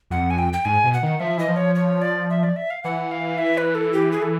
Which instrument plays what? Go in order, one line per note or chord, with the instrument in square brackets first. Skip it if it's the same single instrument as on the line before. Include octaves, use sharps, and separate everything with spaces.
[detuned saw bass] F2 [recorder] F#5
[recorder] G#5
G5
G5
[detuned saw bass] G#2 [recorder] G#5
[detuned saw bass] B2
[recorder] F#5
[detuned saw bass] D#3
[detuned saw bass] F3 [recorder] E5
[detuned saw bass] E3 [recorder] D#5
[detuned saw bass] F3
[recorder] C#5
C#5
D5
E5
D5
E5
F5
[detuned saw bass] E3 [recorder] F#5
[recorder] F5
E5
B4
A4
G4
G#4
A4